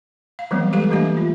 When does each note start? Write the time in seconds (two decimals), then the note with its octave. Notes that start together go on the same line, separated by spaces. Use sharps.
0.39 F5
0.51 E3 F#3 G3 A3 B3 C4
0.73 G#3 G4 A4 B4 F5
0.91 E3 A3 A#3 D4 G4 E5
1.17 F4